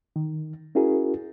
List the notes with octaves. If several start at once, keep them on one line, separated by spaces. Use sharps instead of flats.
D#3
C#4 E4 F#4 G#4 A#4